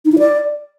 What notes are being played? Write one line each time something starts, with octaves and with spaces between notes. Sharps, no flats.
D#4
E4
D5